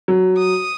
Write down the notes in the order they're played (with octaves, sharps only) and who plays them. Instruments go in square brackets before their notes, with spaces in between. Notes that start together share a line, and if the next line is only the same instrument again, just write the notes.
[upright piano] F#3
[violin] D#6